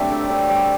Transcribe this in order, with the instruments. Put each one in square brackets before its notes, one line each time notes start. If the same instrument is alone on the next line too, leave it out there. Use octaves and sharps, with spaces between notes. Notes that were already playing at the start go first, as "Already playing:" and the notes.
Already playing: [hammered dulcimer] F#3 G3 A3 C4 D4 D5 E5
D3
D3
G3